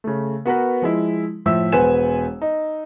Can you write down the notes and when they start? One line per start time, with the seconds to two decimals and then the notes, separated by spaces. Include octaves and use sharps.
0.04 C#3 A3
0.45 B3 F#4 A#4 B4
0.82 F3 G#3 E4
1.46 A2 F3 E5 E6
1.72 E1 B3 B4 C5 G#5 E7
2.42 D#4